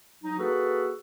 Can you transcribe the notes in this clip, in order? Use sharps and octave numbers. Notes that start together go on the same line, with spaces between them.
F#3 D#4
A#3 F#4 G#4 A4 B4